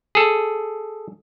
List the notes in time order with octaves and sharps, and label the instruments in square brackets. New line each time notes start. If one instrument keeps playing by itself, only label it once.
[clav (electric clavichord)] G#4 A4